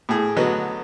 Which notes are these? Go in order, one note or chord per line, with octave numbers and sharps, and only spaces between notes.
A2 G#4
D3 F#3 B3 D#5